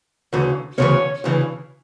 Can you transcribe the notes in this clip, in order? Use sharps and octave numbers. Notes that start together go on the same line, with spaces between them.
D2 C#3 E3
D2 C#3 E3 C#4 C#5
D2 C#3 E3